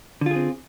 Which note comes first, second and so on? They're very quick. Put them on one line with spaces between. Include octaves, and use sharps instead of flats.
D3 F4 G#4 C4